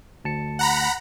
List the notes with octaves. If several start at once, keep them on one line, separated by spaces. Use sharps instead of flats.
D2 A5 C#7
F#5 A#5 B5